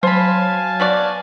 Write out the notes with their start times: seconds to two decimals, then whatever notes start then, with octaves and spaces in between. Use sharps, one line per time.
0.03 F#3 C5 F5 G#5 A5 B5
0.80 B2 F#4 D5